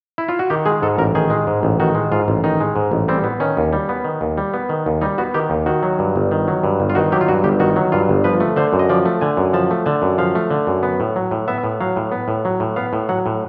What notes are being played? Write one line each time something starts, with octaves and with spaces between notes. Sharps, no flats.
E4
F4
F#4
D#3 G4
G#3 G#4
G#2 A4
A1 A#4
D#3 G#4
G#3
G#2
A1
D#3 F#4
G#3
G#2 F4
A1
D#3 D#4
G#3
G#2
A1
G3 C4
B3
D#3 C#4
D#2
G3
B3
D#3
D#2
G3
B3
D#3
D#2
G3 D#4
B3 F#4
D#3 G4
D#2
D#3 F#4
F#3
G2
G1
D#3
F#3
G2
G1
F4
D#3 F#4
F#3 G4
F4
G2 F#4
G1 G4
D#3 F#4
F#3
G2 F4
G1
F3 B4
A3
D3 C5
F#2
D#5
F3 D5
A3
D3 G#5
F#2
F3 A5
A3
D3 A5
F#2
F3 F5
A3
D3
F#2
B3
A2
F#3
A2
B3 E5
A2
F#3 F5
A2
B3
A2
F#3
A2
B3 F5
A2
F#3 F#5
A2